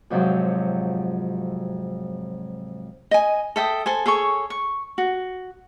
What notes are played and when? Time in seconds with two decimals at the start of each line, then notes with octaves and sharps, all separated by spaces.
0.10 F2 G#2 C3 F3 F#3
3.11 D#5 G#5
3.56 A4 E5 G5 D#6
3.86 A4 C5 G#5
4.06 G#4 A4 C#5 C#6
4.50 C#6
4.98 F#4